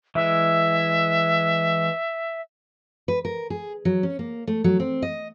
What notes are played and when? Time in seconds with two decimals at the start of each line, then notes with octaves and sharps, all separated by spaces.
0.15 E3 G#3 E5
3.08 B4
3.25 A#4
3.50 G#4
3.85 F#3
4.03 C#4
4.19 A#3
4.47 A3
4.64 F#3
4.80 C4
5.02 D#5